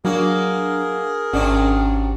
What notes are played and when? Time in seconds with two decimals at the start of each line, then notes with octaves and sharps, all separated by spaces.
0.05 F#3 A#3 D4 F#4 G#4 A#4
1.33 G#1 C3 C#4 D4 F#4